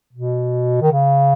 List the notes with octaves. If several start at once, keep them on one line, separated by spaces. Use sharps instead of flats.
B2
D#3
C#3